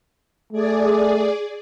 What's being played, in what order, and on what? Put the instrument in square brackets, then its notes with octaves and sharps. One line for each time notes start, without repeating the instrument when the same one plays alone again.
[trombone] A3 [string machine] G#4 D5